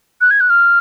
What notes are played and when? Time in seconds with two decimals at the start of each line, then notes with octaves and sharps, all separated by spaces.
0.21 F#6
0.31 G#6
0.40 F#6
0.50 F6